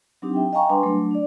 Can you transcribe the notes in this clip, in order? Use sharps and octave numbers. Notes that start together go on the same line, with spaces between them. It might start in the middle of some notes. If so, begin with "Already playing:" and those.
F#3 C4 D4 D#4 G4
E5 G5
D#5 F5 G5 G#5 A#5 C#6
G3 D4 B4 G#5 C6
F#3 A3 D4
D4 D5